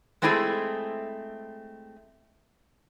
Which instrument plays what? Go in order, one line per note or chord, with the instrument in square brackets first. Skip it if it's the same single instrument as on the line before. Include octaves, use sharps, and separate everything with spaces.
[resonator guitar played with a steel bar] G#3 A3 C4 E4 G#4 A4